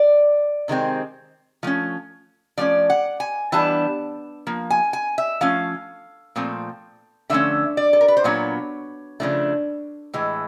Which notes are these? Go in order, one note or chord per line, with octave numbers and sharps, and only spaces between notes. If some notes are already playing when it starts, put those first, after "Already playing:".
Already playing: D5
C3 D#3 G#3 C4
F3 A3 C#4
F3 A3 C#4 D5
F#5
G#5
E3 G3 B3 D4 A5
F3 A#3
G#5
G#5
E5
F3 A3 C#4 F5
A#2 F3 A3 C4
D3 F3 A3 C#4 E5
D5
A4
A#4
B4
C5
A#2 F#3 B3 D4 C#5
C#3 F3 A3 D4
A2 E3 G#3